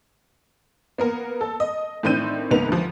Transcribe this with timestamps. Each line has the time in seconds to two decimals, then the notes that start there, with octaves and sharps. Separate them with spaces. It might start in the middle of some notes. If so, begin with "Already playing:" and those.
0.98 A#3 B3 A#4
1.41 A4
1.60 D#5
2.03 A2 D#3 C4 D4 G6 D#7
2.51 C#2 G#2 A#3 B3 B4 F7
2.68 D2 F3